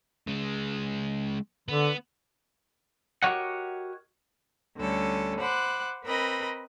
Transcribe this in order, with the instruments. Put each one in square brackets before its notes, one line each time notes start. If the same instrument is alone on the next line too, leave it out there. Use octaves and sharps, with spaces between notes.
[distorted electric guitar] C#3 G#3
[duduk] D3 [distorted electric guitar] B3
[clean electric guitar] F#4 G4 A#4 C#5 D#5 F#5
[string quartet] D2 D3 G3 C#4 A4
C5 F#5 B5 D6 F#6
C4 A#4 B4 D#5 B5